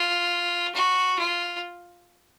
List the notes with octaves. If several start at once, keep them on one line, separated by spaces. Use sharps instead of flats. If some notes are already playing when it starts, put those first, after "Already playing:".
Already playing: F4
F#4
F4